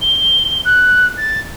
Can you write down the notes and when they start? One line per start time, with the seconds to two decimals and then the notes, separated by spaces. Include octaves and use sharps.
0.01 G7
0.65 F#6
1.17 A6